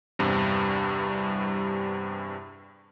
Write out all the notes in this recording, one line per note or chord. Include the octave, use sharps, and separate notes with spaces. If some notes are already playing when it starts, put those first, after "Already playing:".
E2 G2 C3 G3